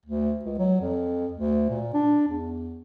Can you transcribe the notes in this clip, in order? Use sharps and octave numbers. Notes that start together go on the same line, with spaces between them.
D2
C#2
F#3
F2
D2
A#2
D4
E2